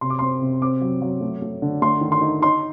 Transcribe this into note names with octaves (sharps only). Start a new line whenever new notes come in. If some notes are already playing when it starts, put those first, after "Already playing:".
C3 C6
D6
C4 C6
C3
C4 D6
F#3
F#3
A3
A3
D3
A3 C6
D#3
C6
D#4
D#4 C6